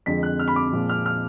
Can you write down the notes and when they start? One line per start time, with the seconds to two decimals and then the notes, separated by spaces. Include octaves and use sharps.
0.06 F2 D3 G#3 B6
0.23 F#6
0.39 F6
0.48 B5
0.56 D6
0.73 A#2 F3 G#3
0.89 F6
1.06 F6